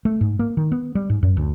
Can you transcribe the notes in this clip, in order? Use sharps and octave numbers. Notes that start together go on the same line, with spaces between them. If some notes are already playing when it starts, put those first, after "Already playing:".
A3
G#2
A#3
D#3
B3
G3
G#2
F#2
D2